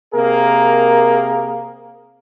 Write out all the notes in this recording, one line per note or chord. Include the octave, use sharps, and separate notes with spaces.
C3 A#3 G#4 A#4